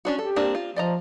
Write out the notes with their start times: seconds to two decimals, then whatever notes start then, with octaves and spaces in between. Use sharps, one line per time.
0.05 C#4 D4 F#4
0.19 G4 A4
0.36 A#3 C4 D4
0.55 F4
0.76 F3 D5 D#5 A#5